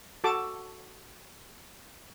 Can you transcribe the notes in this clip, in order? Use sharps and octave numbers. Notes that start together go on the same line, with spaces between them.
F#4 A4 A5 D6